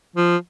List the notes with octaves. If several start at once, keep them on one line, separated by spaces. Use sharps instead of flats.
F3